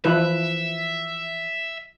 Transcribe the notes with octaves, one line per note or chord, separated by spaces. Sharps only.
E3 F3 E4 B4 E5